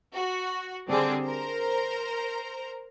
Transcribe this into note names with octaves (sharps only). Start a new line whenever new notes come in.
F#4
D3 G3 C4 D4 G#4
A#4 C5 A#5